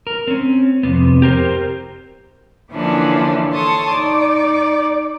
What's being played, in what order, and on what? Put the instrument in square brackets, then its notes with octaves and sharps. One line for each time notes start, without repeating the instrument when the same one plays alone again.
[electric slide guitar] A#4
C4 C#4
F2 G#2 C3 B3
G4 A#4 C5
[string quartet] D3 E3 F3 A#3 C#4 D4
A4 C#5 A5 C6 C#6 D#6
D#4 D5